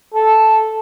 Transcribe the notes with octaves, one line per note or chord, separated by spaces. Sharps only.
A4